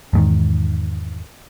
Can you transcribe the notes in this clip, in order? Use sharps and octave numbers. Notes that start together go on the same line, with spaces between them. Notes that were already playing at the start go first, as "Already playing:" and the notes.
E2 G#2 D#3